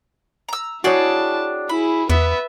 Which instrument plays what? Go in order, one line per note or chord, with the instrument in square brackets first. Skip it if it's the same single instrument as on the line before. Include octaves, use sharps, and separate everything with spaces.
[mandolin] A#5 E6
[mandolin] D4 G#4 G5 [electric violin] E4 A5 [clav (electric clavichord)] F#4 C#5
[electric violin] E4 G#4 [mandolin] B5
[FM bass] E2 [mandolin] B3 [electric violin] B4 E5